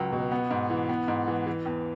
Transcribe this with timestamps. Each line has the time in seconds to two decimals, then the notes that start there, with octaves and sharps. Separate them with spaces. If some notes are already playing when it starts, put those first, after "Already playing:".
Already playing: C#2 F#3
0.12 B2
0.31 B3
0.51 G#2
0.70 E3
0.89 B3
1.08 G#2
1.27 E3
1.46 E3
1.66 E2